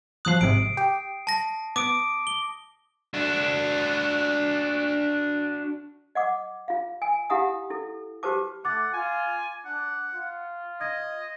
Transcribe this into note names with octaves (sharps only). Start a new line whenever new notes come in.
F3 F#3 D#6 F#6 C7
G#1 G#2 C3 D7
G4
A5 A#6
B3 D6 D#6 D7
G7
D4 F#4
D#5 F#5 D6
F4 F5
G#5
E4 G4 F5 F#5 A#5 D#6
E4 A4
F#4 G4 B4 C5 A5 D6
A3 F#5 D6 A6
F4 G#5
D4 F#5
F4
D#5 G#6